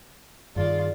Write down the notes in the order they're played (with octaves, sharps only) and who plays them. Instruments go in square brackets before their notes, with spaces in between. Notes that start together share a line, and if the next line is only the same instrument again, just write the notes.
[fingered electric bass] G2 D#3 [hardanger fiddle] F4 D5 [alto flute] G#4